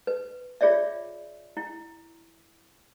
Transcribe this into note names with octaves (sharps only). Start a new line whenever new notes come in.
B4
F4 G#4 C#5 D5 E5
E4